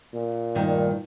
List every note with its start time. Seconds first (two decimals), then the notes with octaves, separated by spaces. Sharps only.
0.14 A#2
0.55 D2 G2 D#3